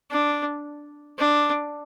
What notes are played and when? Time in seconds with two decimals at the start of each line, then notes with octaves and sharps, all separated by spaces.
0.11 D4
1.18 D4